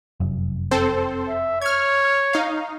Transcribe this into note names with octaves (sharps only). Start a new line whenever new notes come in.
F1 F#2
C4 A4 C5
E5
C#5 F6 G#6
D#4 F5